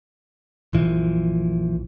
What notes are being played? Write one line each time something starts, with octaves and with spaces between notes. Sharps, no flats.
A#1 F#2 E3 F3